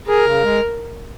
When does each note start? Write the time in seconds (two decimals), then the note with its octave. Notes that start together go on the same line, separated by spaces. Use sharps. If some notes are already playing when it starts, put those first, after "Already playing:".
0.08 G#4 A#4
0.25 C#3
0.43 G#3